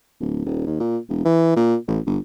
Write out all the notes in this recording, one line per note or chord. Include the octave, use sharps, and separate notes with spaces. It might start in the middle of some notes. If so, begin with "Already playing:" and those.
D1
D#1
D#2
A#2
E1
E3
A#2
A1
G1